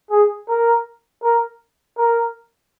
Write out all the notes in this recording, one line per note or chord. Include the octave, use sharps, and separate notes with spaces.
G#4
A#4
A#4
A#4